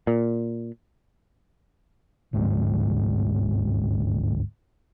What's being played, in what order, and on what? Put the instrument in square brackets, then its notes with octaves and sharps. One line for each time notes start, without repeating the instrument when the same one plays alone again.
[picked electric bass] A#2
[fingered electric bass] G1 D2 G#2 G#3